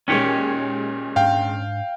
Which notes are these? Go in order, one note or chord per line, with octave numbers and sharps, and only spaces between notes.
D#2 A#2 G#3 C#4 G4 C#5
G#2 D4 F5 G5